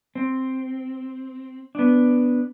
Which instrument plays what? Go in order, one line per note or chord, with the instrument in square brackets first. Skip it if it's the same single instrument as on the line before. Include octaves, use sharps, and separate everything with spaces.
[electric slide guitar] C4
B3 D4